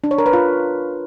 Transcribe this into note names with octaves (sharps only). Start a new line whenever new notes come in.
D4
C#5
A#4
B4
F4